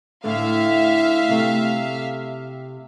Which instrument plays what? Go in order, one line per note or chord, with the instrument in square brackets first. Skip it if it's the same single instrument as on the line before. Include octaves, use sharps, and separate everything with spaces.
[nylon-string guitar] A2 D3 A3 [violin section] E5 F5
[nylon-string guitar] C3 A3